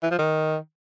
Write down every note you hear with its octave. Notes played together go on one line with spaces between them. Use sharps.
E3
F3
D#3